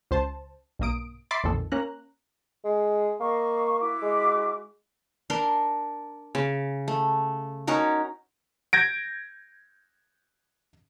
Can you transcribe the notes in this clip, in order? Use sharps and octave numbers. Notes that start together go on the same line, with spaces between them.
C#2 C5 A5
B1 G2 A#3 D#6 D7
E5 B5 C6 D6 A6 C7
B1 F2 A#2 D#3 A4
A#3 C#4 A#5 F#6
G#3
A#3 D#5 F5 C#6
E4 F#4 D6
G#3
D4 A#4 C6
C#3
A3
C#4 D#4 F#4 A#4
G6 G#6 A#6 D7